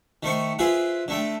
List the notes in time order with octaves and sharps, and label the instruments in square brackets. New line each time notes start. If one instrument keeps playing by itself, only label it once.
[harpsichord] D#3 A3 C5 C#6
E4 F4 G#4 B4 C5
D3 A3 G5